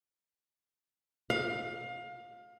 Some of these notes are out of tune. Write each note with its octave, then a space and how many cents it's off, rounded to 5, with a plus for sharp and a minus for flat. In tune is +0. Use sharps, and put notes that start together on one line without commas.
F5 +25